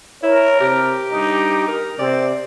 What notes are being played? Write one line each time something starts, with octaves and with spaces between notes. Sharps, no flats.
E4 A#4 C#5
C3 G4
G2 D#4
A#4
C3 C4 D5